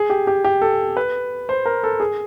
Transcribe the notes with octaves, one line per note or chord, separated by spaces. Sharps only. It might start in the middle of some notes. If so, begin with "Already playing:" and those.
Already playing: G#4
G4
G4
G4
A4
B4
C5
A#4
A4
G#4